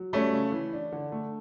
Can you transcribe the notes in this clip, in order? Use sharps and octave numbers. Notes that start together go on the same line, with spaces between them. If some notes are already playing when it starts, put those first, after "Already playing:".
Already playing: F#3
G3 A3 C#4
C#3
E3
D4
D3
A3